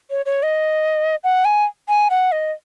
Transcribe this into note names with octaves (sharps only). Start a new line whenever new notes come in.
C#5
C#5
D#5
F#5
G#5
G#5
F#5
D#5